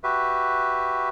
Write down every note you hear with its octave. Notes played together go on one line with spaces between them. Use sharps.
F#4 G4 B4 E5